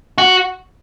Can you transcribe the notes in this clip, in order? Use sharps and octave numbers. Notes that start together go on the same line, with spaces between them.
F#4